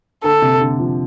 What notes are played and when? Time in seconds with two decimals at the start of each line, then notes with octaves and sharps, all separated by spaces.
0.24 D3 A4
0.42 C3
0.61 D3
0.79 F3